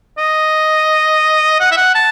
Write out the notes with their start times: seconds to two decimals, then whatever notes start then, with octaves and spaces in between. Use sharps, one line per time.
0.18 D#5
1.60 F#5
1.72 E5
1.77 F#5
1.95 A5